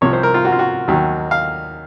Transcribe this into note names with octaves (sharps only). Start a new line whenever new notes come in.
C2 C3 F3 C#5
C5
A#4
F4
F#4
F4
F#4
D#2 D#3 F#3
F5